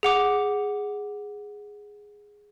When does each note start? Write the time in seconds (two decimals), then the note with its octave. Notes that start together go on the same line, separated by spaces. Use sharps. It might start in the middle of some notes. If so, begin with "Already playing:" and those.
0.03 G#4 F#5 D6